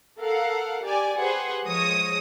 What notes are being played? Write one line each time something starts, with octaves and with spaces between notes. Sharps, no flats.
A4 A#4 F5 F#5
G4 D5 G#5
G4 G#4 B4 C5 F#5
F3 G#3 C#5 D#6 A#6